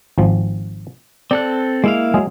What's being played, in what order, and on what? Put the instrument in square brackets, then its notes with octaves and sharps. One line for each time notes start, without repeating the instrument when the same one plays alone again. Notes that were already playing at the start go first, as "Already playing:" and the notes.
[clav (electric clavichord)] G#1 F3
[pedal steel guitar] C4 A4 F#6 [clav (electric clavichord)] D5
[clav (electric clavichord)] G#3 [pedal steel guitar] A#3 E4 F5
[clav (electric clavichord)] F#3 G#3 G#4